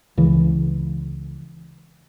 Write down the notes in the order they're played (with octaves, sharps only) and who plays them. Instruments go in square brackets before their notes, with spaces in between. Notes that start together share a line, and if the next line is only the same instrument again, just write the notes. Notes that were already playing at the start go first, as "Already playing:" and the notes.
[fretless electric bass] C#2 C#3 E3